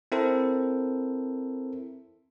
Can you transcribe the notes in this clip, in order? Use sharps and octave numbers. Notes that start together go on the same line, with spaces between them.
C4 E4 A4 A#4 C5